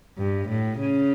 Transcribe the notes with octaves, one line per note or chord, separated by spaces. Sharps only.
G2
A2
C#3